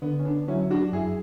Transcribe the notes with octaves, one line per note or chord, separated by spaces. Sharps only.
D3 B3
C#4
B3 D4
F#3 C#4 E4
D4 F#4
F#2 E4 G#4